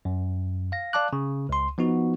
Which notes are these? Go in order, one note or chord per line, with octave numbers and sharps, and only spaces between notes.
F#2
F5 A#6
D5 F5 A5 D6 F#6
C#3
C#2 C6
F3 B3 D#4 F#4